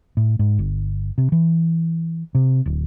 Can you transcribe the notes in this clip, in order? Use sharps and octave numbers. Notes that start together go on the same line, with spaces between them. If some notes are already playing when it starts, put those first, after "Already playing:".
A2
G#2
G1
C3
E3
C3
D1